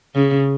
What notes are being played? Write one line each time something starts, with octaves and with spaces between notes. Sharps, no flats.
C#3